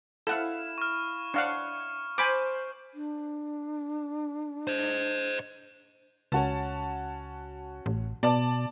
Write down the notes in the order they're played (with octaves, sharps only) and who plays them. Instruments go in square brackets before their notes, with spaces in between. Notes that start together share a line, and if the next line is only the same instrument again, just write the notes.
[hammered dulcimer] E4 F5 [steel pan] A4 F#5 [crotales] E7
[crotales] C#6 F6
[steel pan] D4 F5 F#5 [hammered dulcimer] C#5
[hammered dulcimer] C5 [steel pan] G#5 B5 D6
[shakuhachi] D4
[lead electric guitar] C5 D#5
[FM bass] C#2 [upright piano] C#4 F#4 A5
[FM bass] A1
[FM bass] B2 [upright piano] D5 A5